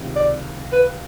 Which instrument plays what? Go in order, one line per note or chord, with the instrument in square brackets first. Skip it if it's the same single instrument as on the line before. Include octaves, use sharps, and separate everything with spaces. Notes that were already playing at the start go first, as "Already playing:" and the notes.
Already playing: [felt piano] C#2 C3 D#3
[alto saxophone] D5
B4